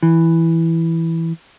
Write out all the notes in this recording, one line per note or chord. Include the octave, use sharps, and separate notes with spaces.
E3